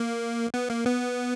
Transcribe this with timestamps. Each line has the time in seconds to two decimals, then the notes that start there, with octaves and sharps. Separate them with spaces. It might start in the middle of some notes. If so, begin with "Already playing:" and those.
Already playing: A#3
0.54 B3
0.70 A#3
0.86 B3